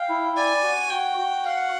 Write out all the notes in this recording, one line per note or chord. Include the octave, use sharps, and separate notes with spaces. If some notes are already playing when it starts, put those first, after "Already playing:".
Already playing: F5 G5
E4
D5 G#5
F#4
F#4 G5
F#4
F5 F#5